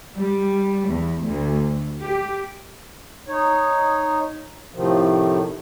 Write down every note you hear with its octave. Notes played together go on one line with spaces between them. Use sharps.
G3
E2
D2
G4
D#4 C#5
A2 C3 D#3 F3